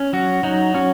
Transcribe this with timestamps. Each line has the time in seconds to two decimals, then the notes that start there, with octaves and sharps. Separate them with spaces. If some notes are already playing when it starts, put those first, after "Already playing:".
Already playing: C#4
0.13 F#3 F#4
0.43 F#3 D#4
0.74 C#4 F#4